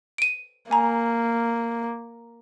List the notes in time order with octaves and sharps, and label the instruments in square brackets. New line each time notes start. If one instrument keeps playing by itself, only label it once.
[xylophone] D7 D#7
[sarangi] A#3 [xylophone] G#5 A#5